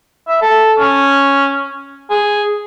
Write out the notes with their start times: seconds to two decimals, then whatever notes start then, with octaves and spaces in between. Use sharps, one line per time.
0.28 E5
0.42 A4
0.79 C#4
2.10 G#4